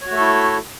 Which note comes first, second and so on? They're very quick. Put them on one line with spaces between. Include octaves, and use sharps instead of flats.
C#5 F#4 A3 A4 E4